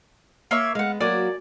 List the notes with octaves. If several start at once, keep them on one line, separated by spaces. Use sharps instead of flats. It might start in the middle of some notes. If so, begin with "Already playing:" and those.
A#3 C#5 E5
G#3 B3 F5 F#5
F#3 A#3 F#4 D5 G#5